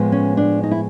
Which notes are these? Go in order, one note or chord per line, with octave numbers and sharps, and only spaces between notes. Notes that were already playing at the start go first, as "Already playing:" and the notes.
Already playing: A2 F3 G#3 B3
C#4
D4
D#4
E4